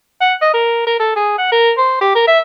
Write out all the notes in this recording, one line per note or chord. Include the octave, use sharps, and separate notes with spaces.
F#5
D#5
A#4
A#4
A4
G#4
F#5
A#4
C5
G4
A#4
E5